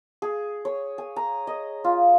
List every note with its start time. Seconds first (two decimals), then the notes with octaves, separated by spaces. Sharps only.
0.22 G#4
0.65 C#5
0.98 G#5
1.16 A#5
1.47 D#5
1.84 F4